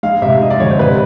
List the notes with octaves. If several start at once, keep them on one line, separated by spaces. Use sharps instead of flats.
G#3 F5
C3 E5
G#3 D#5
D5
D2 C#5
C5
C3 B4